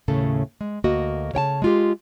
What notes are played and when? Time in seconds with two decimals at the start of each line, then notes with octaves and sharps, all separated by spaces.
0.08 D#2 A2 C#3 A3 A4
0.61 G#3
0.84 D2 A#3 F#4 D#5
1.34 C#3 C#5 G5 A5
1.62 G#3 F4 G4